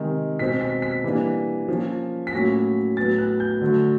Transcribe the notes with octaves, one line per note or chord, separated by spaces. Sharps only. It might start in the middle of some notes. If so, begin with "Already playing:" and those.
Already playing: C3 D#3 G#3
B2 G#3 C4 B6
B6
B6
E3 G3 A#3 D4
F3 A#3 C#4
B6
A2 F#3 A#3 C#4 A#6
A2 F#3 B3 A6
F#6
G6
D3 F#3 A3